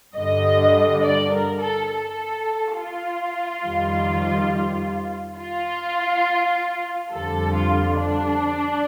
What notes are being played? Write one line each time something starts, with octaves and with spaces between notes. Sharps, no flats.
G2 D3 G3 D#5
D5
A#4
A4
A4
F4
F2 D#3 G3
F4
F2 D3 G3 A4
F4
D4